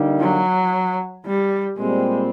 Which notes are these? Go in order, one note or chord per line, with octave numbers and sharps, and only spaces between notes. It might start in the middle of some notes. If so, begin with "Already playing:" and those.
Already playing: D3 G3 A#3 D#4
F#3
G3
A#2 G3 G#3 C4